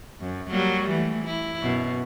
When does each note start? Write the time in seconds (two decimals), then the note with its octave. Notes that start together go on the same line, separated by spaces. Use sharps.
0.20 F#2
0.50 F#3 G3 A#3
0.90 E3 A3
1.25 E4
1.62 F#2 B2